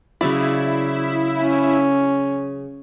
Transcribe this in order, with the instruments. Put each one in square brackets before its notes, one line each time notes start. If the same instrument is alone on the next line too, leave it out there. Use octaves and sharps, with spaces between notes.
[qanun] C#3 F#3 D5 [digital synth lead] E4
[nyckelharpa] C#4